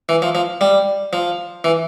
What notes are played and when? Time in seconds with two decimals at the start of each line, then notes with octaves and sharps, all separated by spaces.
0.09 E3
0.22 F3
0.35 F3
0.61 G3
1.13 F3
1.64 E3